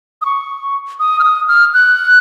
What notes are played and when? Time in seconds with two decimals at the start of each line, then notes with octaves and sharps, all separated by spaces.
0.22 D#6
0.25 C#6
1.00 D#6
1.19 F6
1.24 D#6
1.48 F6
1.74 F#6